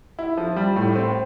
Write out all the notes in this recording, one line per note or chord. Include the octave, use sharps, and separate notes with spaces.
E4
F3
G3
A2
C4